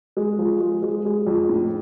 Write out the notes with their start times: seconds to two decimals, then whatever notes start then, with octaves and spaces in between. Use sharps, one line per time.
0.17 G#3
0.39 F3
0.60 G#3
0.82 G#3
1.05 G#3
1.27 F2
1.49 A2